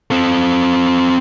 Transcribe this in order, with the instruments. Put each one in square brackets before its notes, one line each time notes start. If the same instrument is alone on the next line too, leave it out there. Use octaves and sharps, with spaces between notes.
[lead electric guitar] C4 A4